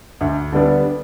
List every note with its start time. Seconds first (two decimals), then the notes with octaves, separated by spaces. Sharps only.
0.21 D2
0.52 D3 G3 B3 D4